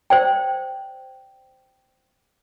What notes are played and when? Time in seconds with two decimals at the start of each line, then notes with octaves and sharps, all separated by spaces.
0.10 C5 D5 G5